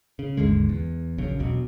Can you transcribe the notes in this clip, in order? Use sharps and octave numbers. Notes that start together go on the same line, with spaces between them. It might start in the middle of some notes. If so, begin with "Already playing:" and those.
C#3
G#1 D#2 D3 G#3
E2
A#1 F#2 C#3
E1 B1 B2